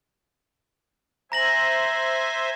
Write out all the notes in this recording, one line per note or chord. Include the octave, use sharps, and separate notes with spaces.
C5 E5 G#5 A#5 A#6 F#7